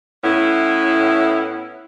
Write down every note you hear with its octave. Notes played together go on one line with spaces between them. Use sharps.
A2 B3 C#4 E4